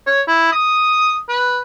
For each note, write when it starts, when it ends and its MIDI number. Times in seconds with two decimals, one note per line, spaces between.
0.07 0.22 73
0.28 0.48 64
0.52 1.17 87
1.29 1.61 71